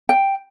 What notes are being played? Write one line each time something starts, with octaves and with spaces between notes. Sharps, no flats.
G5